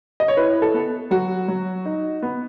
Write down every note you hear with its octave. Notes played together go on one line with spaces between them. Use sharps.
D#5
C#5
E4 B4
A4
B3
F#3 F#4
F#3
D#4
B3